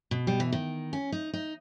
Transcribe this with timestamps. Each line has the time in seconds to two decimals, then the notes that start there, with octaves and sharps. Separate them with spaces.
0.11 B2
0.27 G3
0.40 E3
0.52 D#3
0.93 C#4
1.12 D#4
1.33 D#4